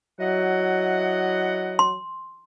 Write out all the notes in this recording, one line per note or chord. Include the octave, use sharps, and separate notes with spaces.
F#3 E4 D#5 F#5
C6